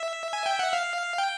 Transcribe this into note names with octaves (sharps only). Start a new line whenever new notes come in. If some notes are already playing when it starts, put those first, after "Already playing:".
Already playing: E5
G#5
G5
F#5
F5
G5